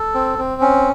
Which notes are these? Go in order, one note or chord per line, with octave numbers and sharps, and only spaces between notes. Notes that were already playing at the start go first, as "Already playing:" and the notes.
Already playing: A4
C4
C4
C#4